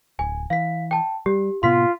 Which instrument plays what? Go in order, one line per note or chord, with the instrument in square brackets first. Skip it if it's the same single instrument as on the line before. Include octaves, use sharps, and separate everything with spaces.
[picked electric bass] D1 [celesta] G#5
[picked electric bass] E3 [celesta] F5 B6
[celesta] G5 A5
[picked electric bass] G3 [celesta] G4
[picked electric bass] A2 C3 B3 [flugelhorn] F4 [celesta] C6 B6